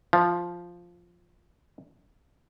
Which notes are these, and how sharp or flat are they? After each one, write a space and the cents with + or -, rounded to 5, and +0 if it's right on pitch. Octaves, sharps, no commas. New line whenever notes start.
F3 +0